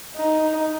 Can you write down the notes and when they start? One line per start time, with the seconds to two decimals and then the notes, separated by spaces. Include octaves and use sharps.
0.16 D#4